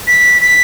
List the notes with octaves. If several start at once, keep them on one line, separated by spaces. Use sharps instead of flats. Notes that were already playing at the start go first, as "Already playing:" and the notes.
B6
B6